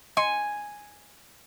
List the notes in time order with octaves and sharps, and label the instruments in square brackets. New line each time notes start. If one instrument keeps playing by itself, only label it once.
[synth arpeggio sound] D#5 C6 C#7 [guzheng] G#5